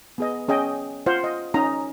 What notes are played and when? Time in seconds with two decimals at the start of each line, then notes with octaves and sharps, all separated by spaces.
0.18 B3 G#4 D#5
0.48 C#4 G#4 D#5 G5
1.06 F4 C5 F5 F#5
1.24 D#5
1.54 C#4 D#4 D#5 A#5